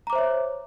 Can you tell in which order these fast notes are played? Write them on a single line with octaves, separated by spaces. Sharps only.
A#5 D6 C5 E5 C#5